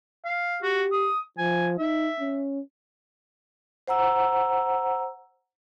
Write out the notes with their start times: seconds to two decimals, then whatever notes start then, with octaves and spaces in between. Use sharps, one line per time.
0.25 F5
0.63 F#4 G4
0.92 D#6
1.38 F3 G#5
1.79 D#4 E5
2.20 C#4
3.88 C5 F#5 A#5 E6